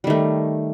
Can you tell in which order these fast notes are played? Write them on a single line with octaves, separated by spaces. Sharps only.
G3 D#3 A3